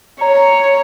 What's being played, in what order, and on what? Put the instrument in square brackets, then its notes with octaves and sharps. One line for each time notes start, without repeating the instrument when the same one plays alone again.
[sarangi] C#5 [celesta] A#5